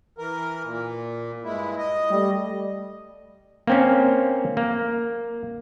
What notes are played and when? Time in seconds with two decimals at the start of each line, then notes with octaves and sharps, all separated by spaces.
0.18 E3 A#4
0.64 A#2
1.44 G2 G#3 E4
1.78 D#5
2.10 G3 A3
3.67 A#3 C4 C#4
4.57 A#3